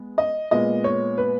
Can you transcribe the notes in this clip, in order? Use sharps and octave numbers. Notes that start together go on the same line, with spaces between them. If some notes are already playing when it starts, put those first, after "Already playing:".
Already playing: G#3 B3
D#5
A#2 G#3 B3 D#5
C#5
B4